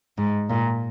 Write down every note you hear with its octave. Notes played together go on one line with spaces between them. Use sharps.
G#2
A#2